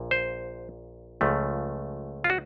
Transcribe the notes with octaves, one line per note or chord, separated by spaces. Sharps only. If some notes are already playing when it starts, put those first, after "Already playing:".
Already playing: A#1 A#2
C5
C#2 C#3 F3 A3
F4
F#4